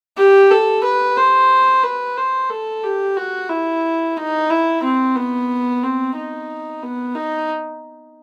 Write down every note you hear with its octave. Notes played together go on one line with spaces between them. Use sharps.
G4
A4
B4
C5
B4
C5
A4
G4
F#4
E4
D#4
E4
C4
B3
C4
D#4
B3
D#4